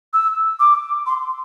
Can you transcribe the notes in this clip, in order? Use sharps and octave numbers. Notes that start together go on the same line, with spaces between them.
E6
D6
C6